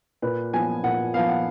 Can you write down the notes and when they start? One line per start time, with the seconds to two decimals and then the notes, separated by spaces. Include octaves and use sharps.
0.22 A#2 B4
0.53 F3 B3 G#5
0.84 A#2 F#5
1.14 F3 B3 F5
1.29 F#5